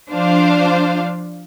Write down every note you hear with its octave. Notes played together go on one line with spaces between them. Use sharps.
F3 D4 F4 C5 F5